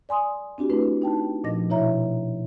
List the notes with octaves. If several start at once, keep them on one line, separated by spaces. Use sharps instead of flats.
D5 G#5 C6 D#6
C4 D4 F#4 G4
A3 D4 E4 B4
D#4 G5 A5
A#2 F3 D#5 A#6
B2 E4 C#5 E5 A#5